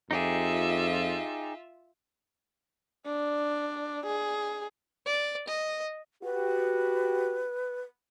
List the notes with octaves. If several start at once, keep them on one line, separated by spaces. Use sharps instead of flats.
F2 D#4 F4 G4 G#4 E5
D4
G#4
D5
D#5
F#4 G4 B4